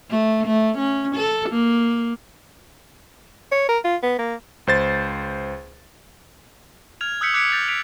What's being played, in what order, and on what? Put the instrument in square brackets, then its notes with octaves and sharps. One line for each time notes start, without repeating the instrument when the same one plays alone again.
[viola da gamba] A3
A3
C#4
A4
A#3
[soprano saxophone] C#5
A#4
F4
B3
A#3
[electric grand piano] C#2 C5 A6
[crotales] F6 G#6 F7
D#6 E6 F#6 G6 B6 C#7
D6 F#6 G#6 B6 C#7 D7
G6 A6 C#7 F7
B6 D7 F7